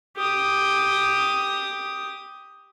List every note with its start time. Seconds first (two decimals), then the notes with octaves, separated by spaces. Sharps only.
0.16 G4 D#6